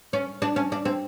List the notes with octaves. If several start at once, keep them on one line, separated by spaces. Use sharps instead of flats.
C#4
D4
C#4
D4
C4